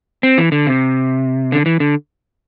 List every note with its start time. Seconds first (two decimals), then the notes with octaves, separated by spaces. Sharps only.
0.23 C4
0.38 E3
0.52 D3
0.67 C3
1.52 D3
1.66 E3
1.80 D3